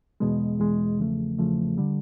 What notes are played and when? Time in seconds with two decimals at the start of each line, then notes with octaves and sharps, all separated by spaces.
0.20 E2 B2 G#3
0.59 E2 B2 G#3
0.98 E2 C#3 F3 A3
1.38 E2 C#3 F3 A3
1.78 D3 G3